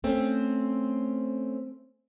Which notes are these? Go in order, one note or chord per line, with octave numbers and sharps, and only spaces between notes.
A3 C4 C#4